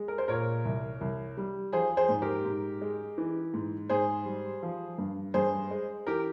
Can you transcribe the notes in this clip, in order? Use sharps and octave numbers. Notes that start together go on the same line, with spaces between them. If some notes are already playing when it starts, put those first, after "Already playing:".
Already playing: G#3
A#4
C5
A#2 A#4 C#5
C2
C2
G3
F3 G#4 C5
G#4 C5
G#2
G4 A#4
G#2
G#3
E3
G#2
G#2 G#4 C5
G3
F3
G2
G2 G#4 C5
G#3
E3 G4 A#4